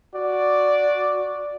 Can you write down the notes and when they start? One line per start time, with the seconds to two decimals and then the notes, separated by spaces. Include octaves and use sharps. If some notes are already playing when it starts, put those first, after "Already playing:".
0.14 F#4 D5